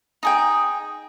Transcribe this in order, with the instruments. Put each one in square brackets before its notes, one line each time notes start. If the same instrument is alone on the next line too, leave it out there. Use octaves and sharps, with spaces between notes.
[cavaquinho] D#4 G#4 G5